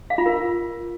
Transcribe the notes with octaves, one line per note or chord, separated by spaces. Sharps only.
F5
F4
A#4